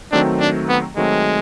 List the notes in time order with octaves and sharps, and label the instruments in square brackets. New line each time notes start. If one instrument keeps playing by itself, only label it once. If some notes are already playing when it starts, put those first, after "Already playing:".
[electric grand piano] D#3 F#3 A3 C4 [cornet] D4
[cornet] D4
B3
[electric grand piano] D#3 F#3 A3 C4 [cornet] G#3